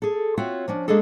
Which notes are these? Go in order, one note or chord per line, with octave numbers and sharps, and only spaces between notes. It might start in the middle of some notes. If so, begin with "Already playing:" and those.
G#4 A4
C4 F4 F#4 C#5 E5
F3 C#4 D4
G#3 A#3 D4 G#4 A4